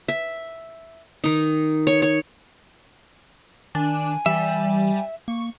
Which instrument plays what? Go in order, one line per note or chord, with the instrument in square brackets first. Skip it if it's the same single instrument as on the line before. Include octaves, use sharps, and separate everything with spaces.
[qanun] E5
D#3 D#4
C#5
C#5
[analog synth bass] D#3 [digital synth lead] D4 [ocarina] G#5
[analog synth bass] E3 [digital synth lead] G3 [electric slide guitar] E5
[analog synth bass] A#3 [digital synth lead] C#6